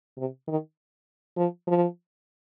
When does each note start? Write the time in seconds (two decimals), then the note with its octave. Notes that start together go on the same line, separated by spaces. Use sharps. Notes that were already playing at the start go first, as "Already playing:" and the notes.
0.18 C3
0.48 D#3
1.37 F3
1.67 F3